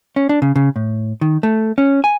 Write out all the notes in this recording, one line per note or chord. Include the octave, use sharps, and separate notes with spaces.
C#4
D4
C#3
C#3
A2
D#3
A3
C#4
G#5